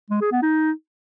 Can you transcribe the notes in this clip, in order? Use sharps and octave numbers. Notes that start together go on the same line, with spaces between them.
G#3
G#4
B3
D#4